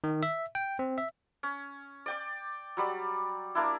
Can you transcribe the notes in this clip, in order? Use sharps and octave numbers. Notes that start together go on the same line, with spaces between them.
D#3
E5
G5
C4
E5
C#4
D5 G5 D6
F#3 G3 D5
A#3 D4 E4